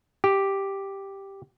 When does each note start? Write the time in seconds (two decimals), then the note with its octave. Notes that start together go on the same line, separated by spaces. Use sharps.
0.24 G4